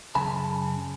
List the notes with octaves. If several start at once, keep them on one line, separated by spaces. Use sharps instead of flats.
F#2 C#3 G#5 A5 B5